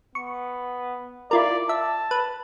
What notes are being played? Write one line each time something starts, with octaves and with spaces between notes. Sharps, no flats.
B3 C#6
E4 F4 A#4 D5
E5 A5
B4